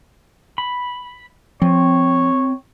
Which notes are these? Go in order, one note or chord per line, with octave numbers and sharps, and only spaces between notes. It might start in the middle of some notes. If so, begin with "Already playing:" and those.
B5
F3 C4 C#5